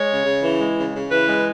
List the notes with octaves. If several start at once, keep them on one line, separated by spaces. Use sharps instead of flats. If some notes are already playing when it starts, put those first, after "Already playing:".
Already playing: G#3 C#5
C#3
C#3
E3
G#3
C#3
C#3
E3 B4
G#3